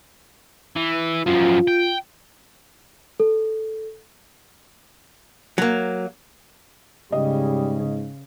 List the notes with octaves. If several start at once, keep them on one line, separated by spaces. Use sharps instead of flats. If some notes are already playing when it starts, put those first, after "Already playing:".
E3
F#2 F3 F4
G5
A4
F#3 A#3
G#2 C#3 G3 D#5